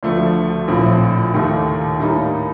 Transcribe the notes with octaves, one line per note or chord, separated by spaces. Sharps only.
D2 D3 F3 A3
A#1 A2 F3 C4
D#2 D#3 A3 D#4 G4
A2 G3 A#3 D#4